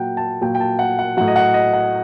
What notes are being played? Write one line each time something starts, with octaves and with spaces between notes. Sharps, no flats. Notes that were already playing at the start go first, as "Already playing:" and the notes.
Already playing: A#2 F#3 F#5 G5
A5
A#2 F#3 G5
G5
A5
F#5
F#5
A2 F#3 F#5
D#5
F#5
D#5
F#5